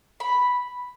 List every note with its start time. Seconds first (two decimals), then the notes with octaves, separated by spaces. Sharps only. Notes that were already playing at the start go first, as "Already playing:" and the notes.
0.20 B5